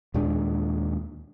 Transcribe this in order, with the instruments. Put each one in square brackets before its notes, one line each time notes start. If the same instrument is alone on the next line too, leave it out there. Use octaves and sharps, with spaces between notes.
[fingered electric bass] D#2 A#2 G#3 D4